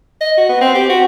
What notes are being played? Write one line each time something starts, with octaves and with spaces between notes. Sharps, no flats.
D#5
F#4
B3
C4
G4
F#4